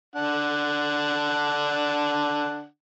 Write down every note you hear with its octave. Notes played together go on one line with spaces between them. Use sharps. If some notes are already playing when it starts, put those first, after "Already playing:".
D3 D4 F#5